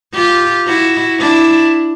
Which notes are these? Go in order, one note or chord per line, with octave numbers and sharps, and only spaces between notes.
F4 G4
E4 F#4
D4 E4